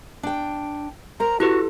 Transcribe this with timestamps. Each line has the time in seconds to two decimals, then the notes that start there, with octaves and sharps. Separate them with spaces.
0.23 D4 G5
1.20 A#4 C5 A#5
1.40 E4 F#4 G4 A4 B4